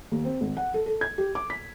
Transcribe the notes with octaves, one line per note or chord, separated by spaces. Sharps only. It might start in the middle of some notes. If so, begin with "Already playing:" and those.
D#2
C4
G#1
F#5
A4
A4
G#6
G4
D6
B6